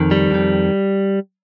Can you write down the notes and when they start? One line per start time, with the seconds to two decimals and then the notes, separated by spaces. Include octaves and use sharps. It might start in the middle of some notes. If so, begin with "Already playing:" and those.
Already playing: F2 D#3
0.11 G3
0.31 F2 D#3